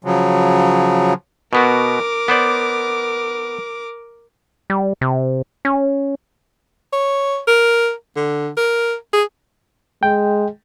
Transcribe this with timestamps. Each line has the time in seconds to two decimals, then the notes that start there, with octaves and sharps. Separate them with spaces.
0.04 C#3 F3 F#3
1.53 B2 B3 F#4 A#4 D6
2.28 B3 C5 D5
4.70 G3
5.01 C3
5.65 C#4
6.93 C#5
7.47 A#4
8.16 D3
8.57 A#4
9.13 G#4
10.03 G#3 G5